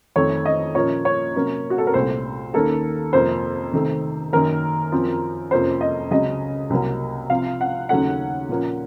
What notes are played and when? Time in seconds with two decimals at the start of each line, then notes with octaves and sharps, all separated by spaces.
0.16 F2 D#3 A3 C4 C#5
0.46 D#5
0.75 A#2 F3 A#3 C#4 C#5
1.05 C#5
1.35 C3 F#3 A#3 C#4
1.70 F#4
1.78 A4
1.87 A#4
1.94 C2 A#2 A3 C4 C5
2.53 D#2 D#3 A#3 C#4 A4
3.13 F2 C3 F3 A#3 C5
3.73 C3 D#3 A3
4.33 F#2 D#3 A#3 A#4
4.92 F#2 F3 C4
5.51 F2 C3 F3 A#3 C#4 C5
5.81 D#5
6.11 C#2 C#3 F#3 C4 D#5
6.70 C2 C3 F#3 A#3
7.30 C3 F3 C4 F5
7.61 F#5
7.89 D#2 C#3 F#3 A3 C#4 F#5
8.49 A#2 F3 A#3 C#4